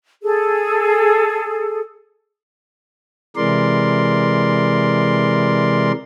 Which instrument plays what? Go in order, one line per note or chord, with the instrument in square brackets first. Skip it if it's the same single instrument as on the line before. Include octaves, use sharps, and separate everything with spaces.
[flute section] G#4 A4
[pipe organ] C3 E3 G#3 A#4 D5 C6